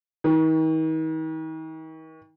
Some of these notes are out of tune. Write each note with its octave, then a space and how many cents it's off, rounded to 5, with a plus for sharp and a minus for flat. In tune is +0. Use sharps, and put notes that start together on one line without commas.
D#3 +40